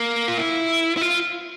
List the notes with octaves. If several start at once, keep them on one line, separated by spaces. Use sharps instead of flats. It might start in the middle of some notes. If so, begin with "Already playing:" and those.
Already playing: A#3
F4
E4
E4
F4